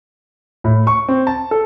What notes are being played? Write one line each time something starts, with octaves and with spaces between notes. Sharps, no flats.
A2
C#6
C4
A5
A4